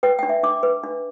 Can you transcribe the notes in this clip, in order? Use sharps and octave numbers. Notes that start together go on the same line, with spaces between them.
B4 G5
D4 G5
E5
D4 D6
B4
D4